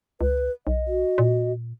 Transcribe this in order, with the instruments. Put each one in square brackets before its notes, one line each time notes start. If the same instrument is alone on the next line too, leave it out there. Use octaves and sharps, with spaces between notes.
[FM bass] C#2 [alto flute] B4
[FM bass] B1 [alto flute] D#5
[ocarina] F#4
[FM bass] A#2